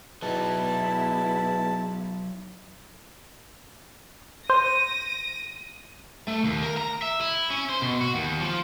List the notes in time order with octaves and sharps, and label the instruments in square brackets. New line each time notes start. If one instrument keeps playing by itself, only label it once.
[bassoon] E2 [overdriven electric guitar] F#3 D#4 [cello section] B3 E4 [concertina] A5
[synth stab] C5 [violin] A#6 D#7
[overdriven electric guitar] A3
D#2
A#4
A#5
E5
E4
C#4
C5
B2
F#4
D#2
F3